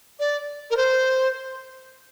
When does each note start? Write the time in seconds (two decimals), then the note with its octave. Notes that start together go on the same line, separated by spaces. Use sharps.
0.19 D5
0.70 A#4
0.76 C5